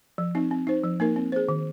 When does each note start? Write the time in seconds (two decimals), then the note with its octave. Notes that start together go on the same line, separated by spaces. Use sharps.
0.18 F3
0.35 C4 D#4
0.51 C4
0.67 D#4 C5
0.84 F3
1.00 A#3 D#4 A#4
1.16 C4
1.32 G#4 C5
1.49 D#3